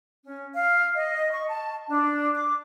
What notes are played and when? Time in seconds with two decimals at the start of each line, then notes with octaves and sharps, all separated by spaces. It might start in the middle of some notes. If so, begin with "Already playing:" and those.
0.24 C#4
0.54 F5
0.95 D#5
1.31 C#6
1.48 A5
1.88 D4
2.34 D6